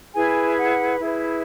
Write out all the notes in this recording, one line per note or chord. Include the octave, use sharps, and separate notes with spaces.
E4 G#4 B4 G#5
F#5
E4 G#4 B4 E5